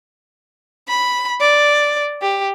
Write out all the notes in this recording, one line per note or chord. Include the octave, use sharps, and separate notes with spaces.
B5
D5
G4